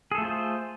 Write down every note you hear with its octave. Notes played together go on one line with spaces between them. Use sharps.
A3 F4 G#4 A4 C5